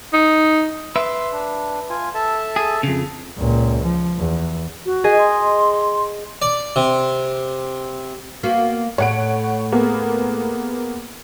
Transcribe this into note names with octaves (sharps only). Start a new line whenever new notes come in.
D#4
B4 E5 C6
D4
F4 G#5
A4 E5 A5
G#4
F2 C#3
C#2 A#2
F3
E2
F#4
G#4 D#5 G#5
C6
D5
C3
A#3 B3 F#4
A2 C#5 F#5 D7
A#3 B3 G#4